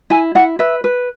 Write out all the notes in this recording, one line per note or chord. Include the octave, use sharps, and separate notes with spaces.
E4 G#5
E4 F#5
B4 E5
B4